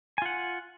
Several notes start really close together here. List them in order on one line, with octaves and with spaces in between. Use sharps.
G#5 F4 F#5